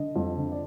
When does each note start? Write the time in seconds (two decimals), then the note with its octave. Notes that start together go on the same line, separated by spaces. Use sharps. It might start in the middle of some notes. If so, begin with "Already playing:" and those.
Already playing: D3 D#5
0.16 F2
0.37 D3
0.52 D5